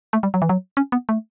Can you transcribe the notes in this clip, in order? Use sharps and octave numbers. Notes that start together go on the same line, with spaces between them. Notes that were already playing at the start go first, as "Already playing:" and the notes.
A3
G3
F#3
E3
F#3
C#4
B3
A3